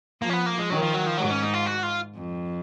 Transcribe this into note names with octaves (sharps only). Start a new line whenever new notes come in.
F3 A#3
C#4
B3
A#3
G#3
D#3 F#3
F3
F#3
F3
G#2 F#3
C#4
D#4
F4
F#4
F4
F2